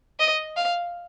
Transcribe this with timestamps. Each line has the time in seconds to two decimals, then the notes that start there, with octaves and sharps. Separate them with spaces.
0.19 D#5
0.57 F5